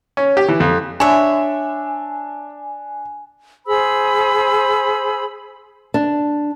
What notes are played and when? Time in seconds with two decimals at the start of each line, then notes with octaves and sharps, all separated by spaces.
0.17 C#4
0.37 G4
0.48 E3
0.60 F2
1.00 D4 C#5 E5 G#5
3.66 G#4 C5 B5 E6
5.94 D4